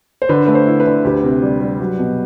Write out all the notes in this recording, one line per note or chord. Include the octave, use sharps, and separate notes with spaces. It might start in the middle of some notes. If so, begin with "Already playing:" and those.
C5
D3 B4
A3 B4
C5
E4
B4
D3
D2 G4
C3
G3
G3
F#3
B2